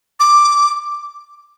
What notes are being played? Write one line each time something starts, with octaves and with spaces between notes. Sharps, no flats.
D6